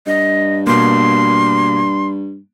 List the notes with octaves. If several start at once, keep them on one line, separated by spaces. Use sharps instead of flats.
G2 D#5
B2 A#3 C6